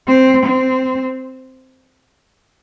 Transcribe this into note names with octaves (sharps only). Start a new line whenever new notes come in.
C4
C4